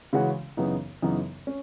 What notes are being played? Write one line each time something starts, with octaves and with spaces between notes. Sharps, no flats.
C#3 E3 G#3 C#4 F#4
F#2 C#3 E3 B3 D#4
F#2 C#3 E3 B3 D#4
C#4